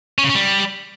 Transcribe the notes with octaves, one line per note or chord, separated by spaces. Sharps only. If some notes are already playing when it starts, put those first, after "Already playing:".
C#4
C#3
C#4
G3